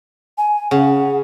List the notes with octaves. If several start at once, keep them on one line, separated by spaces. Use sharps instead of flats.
G#5
C#3 F#5